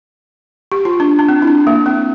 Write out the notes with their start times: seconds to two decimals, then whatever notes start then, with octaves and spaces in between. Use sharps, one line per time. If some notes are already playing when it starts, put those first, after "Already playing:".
0.72 G4
0.85 F4
1.00 D4
1.19 D4
1.28 C4
1.42 E4
1.47 D4
1.67 A#3
1.86 C4